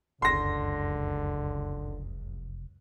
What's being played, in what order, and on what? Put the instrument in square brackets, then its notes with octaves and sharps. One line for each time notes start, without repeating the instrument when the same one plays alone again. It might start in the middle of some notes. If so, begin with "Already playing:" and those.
[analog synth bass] F1 [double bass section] C#2 F#2 [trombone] D3 [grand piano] C6 A#6